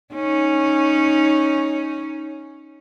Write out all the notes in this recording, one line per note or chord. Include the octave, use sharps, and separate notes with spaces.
C#4 D#4